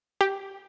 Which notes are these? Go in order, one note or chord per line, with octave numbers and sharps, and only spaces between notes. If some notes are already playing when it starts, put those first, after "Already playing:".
G4